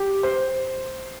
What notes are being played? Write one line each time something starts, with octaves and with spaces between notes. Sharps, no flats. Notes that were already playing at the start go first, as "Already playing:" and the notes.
Already playing: G4
C5